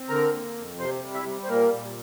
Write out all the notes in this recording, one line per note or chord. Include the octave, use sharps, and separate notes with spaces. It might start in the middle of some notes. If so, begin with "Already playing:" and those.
Already playing: C4
D3 A#4 A#5
A#3
F2
C3 C5 C6
G3
E4 E5
G3
C5
A#2 A#3 A#4
A#2